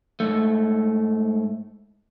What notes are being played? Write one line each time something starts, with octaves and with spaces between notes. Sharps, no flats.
G#2 A3